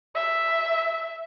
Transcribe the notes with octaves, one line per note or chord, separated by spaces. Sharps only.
E5